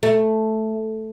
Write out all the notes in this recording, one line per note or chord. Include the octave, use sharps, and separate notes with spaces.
A3